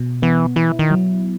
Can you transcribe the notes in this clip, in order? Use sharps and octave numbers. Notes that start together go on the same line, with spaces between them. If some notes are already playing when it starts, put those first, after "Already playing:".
Already playing: B2
E3 B3
E3 E4
D#3
F#3